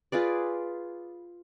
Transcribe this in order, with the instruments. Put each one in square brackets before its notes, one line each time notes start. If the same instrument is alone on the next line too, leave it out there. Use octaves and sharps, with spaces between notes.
[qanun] F4 G#4 B4 D5